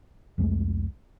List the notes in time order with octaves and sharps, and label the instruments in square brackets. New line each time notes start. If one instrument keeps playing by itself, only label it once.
[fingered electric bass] C2 F2 G#3 A3